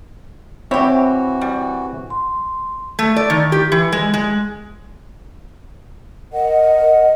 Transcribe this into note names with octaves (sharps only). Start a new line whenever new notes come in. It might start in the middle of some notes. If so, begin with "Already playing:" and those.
E3 C4 E4 F#4 G4 C#5
G3
C6
A3
D5
D#3
G4
E3
G#3
G#3
A#4 D#5 F#5